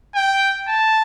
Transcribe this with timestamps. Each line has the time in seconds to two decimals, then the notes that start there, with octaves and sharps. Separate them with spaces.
0.15 G5
0.68 A5